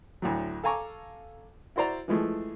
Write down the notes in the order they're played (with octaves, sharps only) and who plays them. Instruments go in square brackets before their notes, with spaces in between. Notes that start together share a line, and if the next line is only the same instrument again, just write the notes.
[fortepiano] D2 A2 F#3
A4 F5 G#5 A#5 C#6 D6
E4 F#4 C5 D5 A#5
E3 F3 G#3 A3